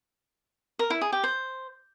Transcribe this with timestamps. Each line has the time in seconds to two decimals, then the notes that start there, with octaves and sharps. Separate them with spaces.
0.79 A#4
0.90 E4
1.01 G#4
1.12 G4
1.23 C5